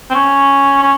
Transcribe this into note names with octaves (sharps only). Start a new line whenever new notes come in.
C4
C#4
C#4